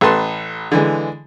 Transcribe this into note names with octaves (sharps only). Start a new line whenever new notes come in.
A1 A4 B4 A5 C6
D3 E3 G#3